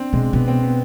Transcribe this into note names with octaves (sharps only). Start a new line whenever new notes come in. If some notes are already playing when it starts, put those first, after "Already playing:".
Already playing: C4 D4
B2 G#3
B2 B3
C4
B3